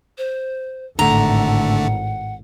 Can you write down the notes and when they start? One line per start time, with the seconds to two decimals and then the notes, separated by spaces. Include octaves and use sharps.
0.18 C5
0.99 G#1 A2 D3 A3 F#5 A#5